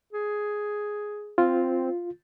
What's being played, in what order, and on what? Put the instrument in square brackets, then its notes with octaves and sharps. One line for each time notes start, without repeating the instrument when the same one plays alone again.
[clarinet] G#4
[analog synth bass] C4 [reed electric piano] F4